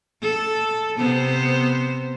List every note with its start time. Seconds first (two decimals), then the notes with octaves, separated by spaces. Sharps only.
0.22 A4
0.98 C3 B3 C5